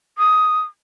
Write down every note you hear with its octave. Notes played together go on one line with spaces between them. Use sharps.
D#6